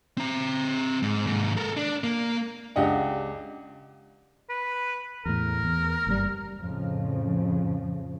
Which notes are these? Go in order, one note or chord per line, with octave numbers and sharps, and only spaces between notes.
C4 A#5
G#2
D#2 G#2
A4 A#4
D4
A#3
C#2 D4 G4 D#5 F#5
B4
E2 A2 A#4
E2
F#1 G2 G3
F2 A2 C#3 F3